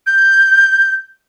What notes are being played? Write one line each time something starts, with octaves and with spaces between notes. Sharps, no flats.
G6